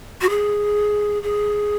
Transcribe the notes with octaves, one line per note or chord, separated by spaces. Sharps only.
F#4
G#4
G#4